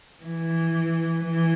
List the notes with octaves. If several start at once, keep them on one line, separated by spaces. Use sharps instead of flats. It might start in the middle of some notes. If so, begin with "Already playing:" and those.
E3
E3